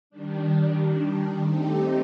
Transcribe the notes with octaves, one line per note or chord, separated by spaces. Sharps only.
D#3 G3 D4
A3 C4 D#4 G4